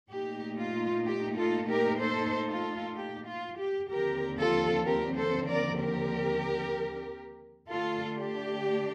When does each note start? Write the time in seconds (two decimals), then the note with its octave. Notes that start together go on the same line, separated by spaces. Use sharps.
0.10 A#2 A3 D#4 G4
0.58 F4
1.06 G4
1.37 F4 A4
1.69 G4 A#4
2.01 A4 C5
2.48 F4 A4
2.96 G4
3.27 F4
3.58 G4
3.90 D#2 D3 F3 C4 G4 A#4
4.38 F4 A4
4.85 G4 A#4
5.17 A4 C5
5.48 A#4 D5
5.80 G4 A#4
7.70 D3 A3 D4 F4 A4
8.18 G4